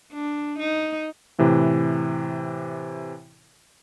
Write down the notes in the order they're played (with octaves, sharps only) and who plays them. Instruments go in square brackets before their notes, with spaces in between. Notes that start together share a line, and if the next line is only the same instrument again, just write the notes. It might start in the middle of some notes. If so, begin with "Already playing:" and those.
[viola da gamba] D4
D#4
[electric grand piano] A2 C3 E3 B4